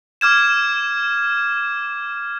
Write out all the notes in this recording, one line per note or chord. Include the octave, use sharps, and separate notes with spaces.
D6 F6 G#6 E7